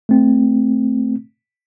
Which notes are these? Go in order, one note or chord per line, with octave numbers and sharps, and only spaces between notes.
A3 C4